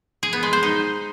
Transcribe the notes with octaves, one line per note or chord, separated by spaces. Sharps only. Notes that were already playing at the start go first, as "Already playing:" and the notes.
G#4
B3
G#3
C5
D#4